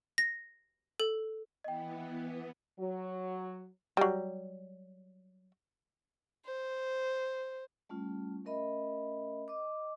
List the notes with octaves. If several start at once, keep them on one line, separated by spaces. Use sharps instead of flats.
A#6
A4
E3 B3 D#5 G5
F#3
F#3 G3
C5
G3 A3 C#4 F4
A3 C#4 A#4 D#5 E5 B5
D#5 D6